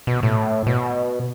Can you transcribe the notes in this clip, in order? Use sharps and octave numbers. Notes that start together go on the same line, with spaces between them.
B2
A2
B2